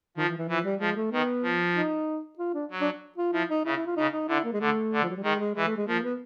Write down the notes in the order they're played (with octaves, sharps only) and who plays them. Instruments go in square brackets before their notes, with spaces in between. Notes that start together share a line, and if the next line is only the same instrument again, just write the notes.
[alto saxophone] D#3 [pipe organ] F3
[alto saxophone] E3
E3
[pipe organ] E3 [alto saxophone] F3
[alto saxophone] G3
[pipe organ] F3 [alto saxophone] G#3
[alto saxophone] A3
[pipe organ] D#3 [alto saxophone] B3
[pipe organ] F3
[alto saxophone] D#4
F4
D4
[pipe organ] F#3
[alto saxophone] D4
F4
[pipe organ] F3 [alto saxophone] E4
[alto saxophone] D#4
[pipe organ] C#3 [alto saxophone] E4
[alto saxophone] E4
F4
[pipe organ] C#3 [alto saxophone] D#4
[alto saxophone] D#4
[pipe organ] D3 [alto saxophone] E4
[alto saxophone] A#3
G#3
[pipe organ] D3 [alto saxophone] A3
[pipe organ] D3
[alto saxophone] F3
F#3
G3
[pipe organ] D#3 [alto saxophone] G#3
[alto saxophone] G#3
[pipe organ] E3 [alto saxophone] G#3
[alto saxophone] A3
G#3
[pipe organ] F3 [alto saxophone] A#3
[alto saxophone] B3